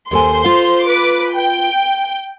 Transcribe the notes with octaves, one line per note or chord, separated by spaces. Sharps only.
D#2 A4 C5 G#5 C6
F4 F5
B4 D6
G5